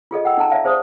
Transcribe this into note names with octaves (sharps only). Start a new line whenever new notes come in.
F4 G#4 A4 D#5
F#5 G5 E6
D#4 A4 F#5 A5 A#5
D5 E5 F5 A5
G#4 C5 D5 A5 D#6